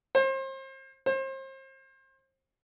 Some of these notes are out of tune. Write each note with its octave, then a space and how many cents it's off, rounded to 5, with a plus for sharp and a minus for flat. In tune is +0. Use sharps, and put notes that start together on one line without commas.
C5 +35
C5 +35